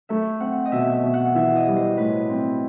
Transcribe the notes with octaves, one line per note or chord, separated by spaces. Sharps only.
A3 E5
C4 F#5
D#5
B2 E5
E5
B2
F#5
E3 E5
D#5
G3
C5
A2 B4
C4